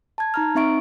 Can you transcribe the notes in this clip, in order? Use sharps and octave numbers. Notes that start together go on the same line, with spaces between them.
A5 G#6
D#4 A#5 F6
C4 D#4 E5 C#6 D7